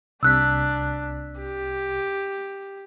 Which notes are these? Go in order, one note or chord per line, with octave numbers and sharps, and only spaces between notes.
C2 C3 D4 E6 F#6 B6
G4